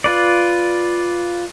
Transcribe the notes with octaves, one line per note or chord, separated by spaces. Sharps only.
F4 B4 D5